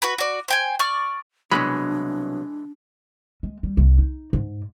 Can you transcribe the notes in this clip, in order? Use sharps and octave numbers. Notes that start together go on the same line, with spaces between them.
F#4 B4 B5
F#4 D5
C5 G5 G#5
D5 C#6 F6
C2 B2 E3 F#3 G#3 D4 B5
G#3
G3
C2
D#4
G#2